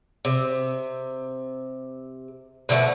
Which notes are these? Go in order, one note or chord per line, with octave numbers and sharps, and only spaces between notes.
C3
B2 D3 F3 A3